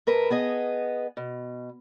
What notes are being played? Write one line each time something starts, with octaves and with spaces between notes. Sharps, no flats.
G#2 A#4 B4 A5
B3 G#4 D#5
B2